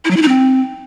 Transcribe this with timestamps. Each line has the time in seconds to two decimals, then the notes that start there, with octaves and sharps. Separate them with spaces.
0.05 E4
0.11 F#3
0.16 E4
0.22 D#4
0.28 C4